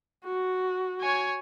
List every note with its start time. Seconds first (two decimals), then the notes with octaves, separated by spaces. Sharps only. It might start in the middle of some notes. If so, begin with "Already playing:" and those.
0.24 F#4
1.01 C#5 G#5